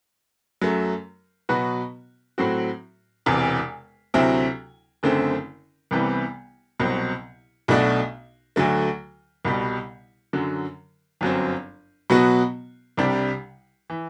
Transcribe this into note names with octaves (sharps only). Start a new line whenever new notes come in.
F#2 F#3 A3
B2 F#3 B3 F#4 B4
A2 F#3 C4 F#4
E1 E2 C3 E3
D2 C3 F#3 C4 E4
F#1 F#2 D3 A3 C4
C2 C3 E3 G3 B3
C2 B2 F#3 C4
B1 B2 A3 D4 F#4
D2 D3 F#3 A3
C2 B2 G3
F#2 D3 F#3
G1 F#2 F#3 C4
B2 F#3 B3 F#4
C2 C3 G3 D4
E3